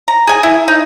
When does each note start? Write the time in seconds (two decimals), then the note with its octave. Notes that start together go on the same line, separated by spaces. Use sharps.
0.08 A#5
0.27 G#4 G#5
0.43 E4
0.68 D#4